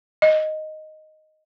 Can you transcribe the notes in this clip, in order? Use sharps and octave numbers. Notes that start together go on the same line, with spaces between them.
D#5